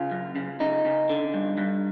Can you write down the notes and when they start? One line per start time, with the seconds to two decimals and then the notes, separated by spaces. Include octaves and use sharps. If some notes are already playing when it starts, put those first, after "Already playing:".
Already playing: C#3 F4
0.11 F#2
0.36 C#3
0.60 C#3 D#4
0.85 C#3
1.09 D3
1.34 G2
1.58 G2